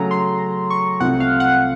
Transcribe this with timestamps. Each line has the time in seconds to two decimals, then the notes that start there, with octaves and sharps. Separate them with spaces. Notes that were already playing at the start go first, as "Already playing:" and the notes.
Already playing: C#3 F#3 A3 A#5
0.11 C6
0.70 C#6
1.00 C2 C3 F3 A3 C4 F#5
1.20 F5
1.40 F#5